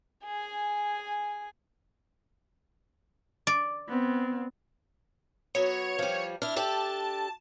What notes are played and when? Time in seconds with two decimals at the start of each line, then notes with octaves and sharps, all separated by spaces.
0.24 G#4 G#5
3.47 D5
3.89 B3 C4
5.55 F#3 B3 C#5
5.99 F3 G3
6.42 D4 E4 F6
6.56 D4 G4 A4 A5